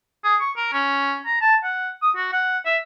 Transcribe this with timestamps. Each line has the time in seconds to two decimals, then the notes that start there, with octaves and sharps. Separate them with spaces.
0.24 G#4
0.41 C#6
0.56 A#4
0.73 C#4
1.26 A#5
1.41 A5
1.63 F#5
2.02 D#6
2.16 F#4
2.32 F#5
2.65 E5